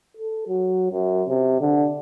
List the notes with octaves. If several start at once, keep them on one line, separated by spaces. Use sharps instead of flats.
A4
F#3
F#2
C3
D3